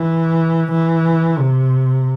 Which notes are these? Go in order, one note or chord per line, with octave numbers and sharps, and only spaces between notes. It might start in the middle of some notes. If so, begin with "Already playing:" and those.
Already playing: E3
E3
C3